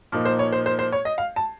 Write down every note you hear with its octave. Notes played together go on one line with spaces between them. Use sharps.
A#2 F3 A#3 D#4
C5
C#5
C5
C5
C5
C#5
D#5
F5
A5